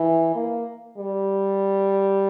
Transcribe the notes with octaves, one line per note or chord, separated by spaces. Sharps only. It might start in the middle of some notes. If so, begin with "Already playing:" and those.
Already playing: E3
A#3
G3